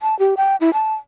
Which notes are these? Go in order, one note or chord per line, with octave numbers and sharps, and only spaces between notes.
A5
G4
G5
E4
A5